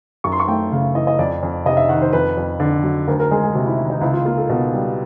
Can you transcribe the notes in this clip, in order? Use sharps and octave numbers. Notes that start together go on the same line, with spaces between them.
F#2 C#6
C6
C#6
A3 G5
C#3 F5
E3 D#5
D#5
F2 D5
F2
C3 D#5
E5
D#3 F#5
C5
F2 B4
F2
D3
F#3
D2 A#4
A#4
G#3 G#4
G#4
C3 F#4
E4
D#3
D#4
C#2 E4
F4
A#3 F4
A4
B2
G3